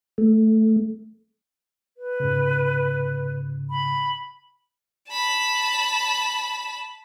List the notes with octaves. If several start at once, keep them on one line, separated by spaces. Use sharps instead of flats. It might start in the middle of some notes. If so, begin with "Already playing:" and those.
A3
B4
G#2 C#3
B5
A5 B5